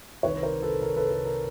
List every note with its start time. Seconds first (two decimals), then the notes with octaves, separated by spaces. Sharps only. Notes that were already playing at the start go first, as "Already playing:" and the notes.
0.23 C2 C3 D#3 B4 C#5
0.33 B4
0.42 A#4 C5
0.63 A4 B4
0.81 A#4
0.96 A4 B4
1.10 A4
1.25 A#4